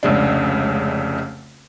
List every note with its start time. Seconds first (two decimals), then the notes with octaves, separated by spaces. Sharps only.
0.03 F1 C#2 C#3 D4